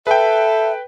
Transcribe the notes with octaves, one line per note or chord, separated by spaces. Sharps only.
A4 B4 E5 G5